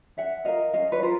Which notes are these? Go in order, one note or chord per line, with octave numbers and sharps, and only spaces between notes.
C#4 E5 F#5
F4 A#4 D#5 F5
C#4 D#5 F5
B4 C#5
F4 A#4 C5